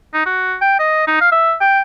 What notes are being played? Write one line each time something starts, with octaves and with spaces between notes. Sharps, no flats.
D#4
F#4
G5
D#5
D#4
F5
E5
G5